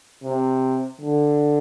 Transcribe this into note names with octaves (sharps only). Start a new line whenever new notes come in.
C3
D3